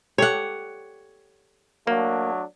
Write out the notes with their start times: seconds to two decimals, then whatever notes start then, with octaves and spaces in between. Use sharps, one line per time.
0.18 G4 A4 C#5 F#5
1.87 F#3 A3 A#3 D4